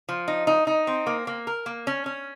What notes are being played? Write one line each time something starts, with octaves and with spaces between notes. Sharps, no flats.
F3
D#4
D#4
D#4
C4
A#3
A#3
A#4
A#3
C#4
C#4